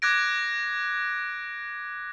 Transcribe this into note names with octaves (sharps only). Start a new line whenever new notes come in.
D6 F#6 G#6 A#6 D7